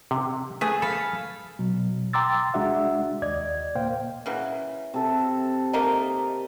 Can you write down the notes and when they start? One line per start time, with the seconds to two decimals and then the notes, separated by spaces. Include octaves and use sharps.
0.11 C3
0.61 A3 G#4 B4 E5
0.82 A4 F5 B5
1.59 B2 F#3
2.13 G5 A#5 C6 D6 E6 A6
2.54 C2 G#3 D4 F#4 E5 F#5
3.22 D#2 D5 D#5 G#6
3.75 A#2 A#3 C5 F5 G5
4.26 C#3 E3 F#3
4.94 C3 A4
5.73 A3 A#3 D#4